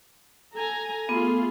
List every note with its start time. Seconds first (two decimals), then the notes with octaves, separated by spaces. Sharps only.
0.55 A4 G#5 A#5
1.09 A3 B3 F4 G#4